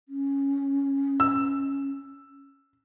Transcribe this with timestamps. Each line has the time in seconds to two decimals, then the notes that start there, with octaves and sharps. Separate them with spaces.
0.09 C#4
1.20 E6